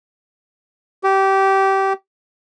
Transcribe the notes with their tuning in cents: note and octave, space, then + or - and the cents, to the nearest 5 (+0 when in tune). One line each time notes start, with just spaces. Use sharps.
G4 -20